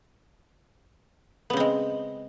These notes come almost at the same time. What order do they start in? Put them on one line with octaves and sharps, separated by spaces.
B3 C#3 C4 G#3